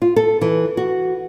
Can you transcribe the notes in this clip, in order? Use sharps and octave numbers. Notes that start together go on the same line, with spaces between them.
F4
A4
E3
F#4